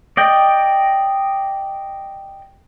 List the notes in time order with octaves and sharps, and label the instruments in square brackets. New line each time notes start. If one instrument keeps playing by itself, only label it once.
[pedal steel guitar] D5 D#5 G5